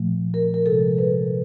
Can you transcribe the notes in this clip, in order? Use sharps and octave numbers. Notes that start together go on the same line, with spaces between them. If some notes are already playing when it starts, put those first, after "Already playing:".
Already playing: A#2 F3 A3
A#4
A#4
C3 F3 G#3 A4
B4